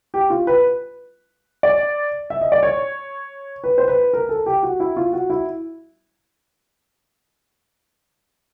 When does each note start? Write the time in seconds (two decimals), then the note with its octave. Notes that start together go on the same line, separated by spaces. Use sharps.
0.14 G4
0.30 F4
0.47 B4
1.63 D5
2.30 E5
2.41 D#5
2.52 D5
2.63 C#5
3.64 B4
3.78 C5
3.88 B4
4.13 A#4
4.29 A4
4.46 G4
4.63 F#4
4.80 E4
4.97 F4
5.13 F#4
5.30 E4